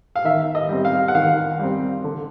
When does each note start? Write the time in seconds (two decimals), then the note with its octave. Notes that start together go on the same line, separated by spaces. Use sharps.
0.16 F5
0.24 D#3 E5
0.55 D#5
0.69 G3 C4
0.85 F5
1.08 F#5
1.14 D#3 F5
1.59 G3 C4
2.04 D3